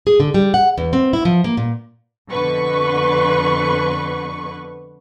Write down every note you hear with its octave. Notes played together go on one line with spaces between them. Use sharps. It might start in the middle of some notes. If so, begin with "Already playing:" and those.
G#4
D3
G3
F#5
E2
C4
E4
F3
A#3
A#2
F2 B2 D3 B4 C#6